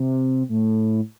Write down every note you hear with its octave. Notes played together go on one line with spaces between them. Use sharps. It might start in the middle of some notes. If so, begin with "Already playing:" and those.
Already playing: C3
A2